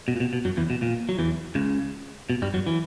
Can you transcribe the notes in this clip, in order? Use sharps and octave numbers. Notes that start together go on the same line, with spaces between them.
B2
A#2
B2
B2
F#2 F#3
E2 E3
B2
A#2
F#3
E2 E3
C#2 C#3
B2
G2 G3
F#2 F#3
E3